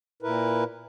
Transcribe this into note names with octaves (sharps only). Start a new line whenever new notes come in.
A#2 E4 A#4 B4